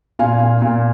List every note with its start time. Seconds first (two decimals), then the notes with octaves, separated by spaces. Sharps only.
0.19 A#2 F5 G#5
0.40 A#2
0.62 A#2